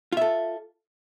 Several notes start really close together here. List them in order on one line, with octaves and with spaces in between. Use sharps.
F4 E5 A4